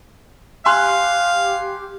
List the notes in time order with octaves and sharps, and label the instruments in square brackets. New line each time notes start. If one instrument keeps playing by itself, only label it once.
[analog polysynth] G4 [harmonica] F5 [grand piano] G#5 C6 F#6